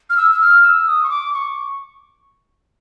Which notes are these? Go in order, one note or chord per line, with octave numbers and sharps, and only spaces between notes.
F6
E6
E6
F6
E6
D#6
C#6
D6
C#6